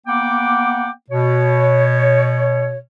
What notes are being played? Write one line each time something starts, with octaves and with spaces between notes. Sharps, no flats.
A#3 B3 F#5 G5 D6
B2 C#5